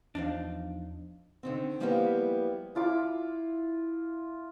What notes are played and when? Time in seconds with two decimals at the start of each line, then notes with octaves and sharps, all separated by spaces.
0.15 E2 F3 D4 D#4 F5
1.43 D3 D#3 C4
1.80 F3 G3 A#3 B3 E4 G4
2.75 E4 F4 B5 D6